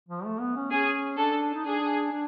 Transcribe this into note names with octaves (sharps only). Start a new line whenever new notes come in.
F3
A3
B3
C#4
C#4 G#4
D4 A4
D#4
D4 G#4
D4